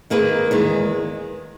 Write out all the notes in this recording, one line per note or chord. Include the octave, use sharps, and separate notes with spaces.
D#3 A#3 D#4 G#4 B4
E2 D#3 G#3